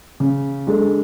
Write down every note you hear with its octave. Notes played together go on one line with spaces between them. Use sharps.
C#3
G#3 D4 A4